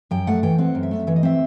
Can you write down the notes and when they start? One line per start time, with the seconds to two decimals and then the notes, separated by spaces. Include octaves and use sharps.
0.11 F#2 G5
0.27 A3 F#5
0.43 E3 G5
0.58 C4 F#5
0.75 F#2
0.83 E5
0.91 A3
1.07 E3 E5
1.16 D#5
1.23 C4 E5